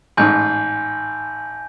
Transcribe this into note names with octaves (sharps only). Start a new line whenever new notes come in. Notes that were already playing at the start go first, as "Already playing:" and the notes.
A1 G#2 G#5 G6